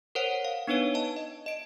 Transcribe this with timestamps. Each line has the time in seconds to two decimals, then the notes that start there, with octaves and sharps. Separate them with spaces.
0.15 A#4 C5 C#5 F#5
0.45 F5
0.67 B3 D4 D#4 B4 C#5 D7
0.94 D#5 A5
1.17 D#5
1.46 D#5 D7